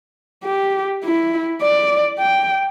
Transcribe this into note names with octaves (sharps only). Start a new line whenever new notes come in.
G4
E4
D5
G5